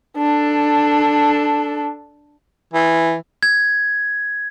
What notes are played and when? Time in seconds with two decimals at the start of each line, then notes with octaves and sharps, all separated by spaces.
0.18 D4 A4
2.74 E3
3.43 G#6